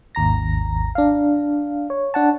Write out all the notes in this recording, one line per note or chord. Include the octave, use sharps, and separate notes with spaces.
G#1 D#2 A#5 A#6
D4 F5
C#5
D4 F#5 A5